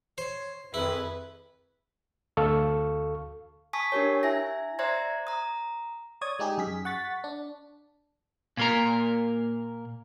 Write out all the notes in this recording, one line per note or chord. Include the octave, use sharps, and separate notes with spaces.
C5 C#5
F2 D#3 E4 G#4 B4
D2 A4 F5 C#6
G#5 A5 C#6 D#6 B6
D4 G4 A#4 C#5
E4 E5 G#5 A#6
C5 D5 E5 A#5 C6 G#6
A#5 D#6
C#5 D5 D#6 G#6
G#3 D#4 G4 G#4
F#2 G#4 B6
F#5 C#6 A6 B6
D4
A#2 A#3 A#4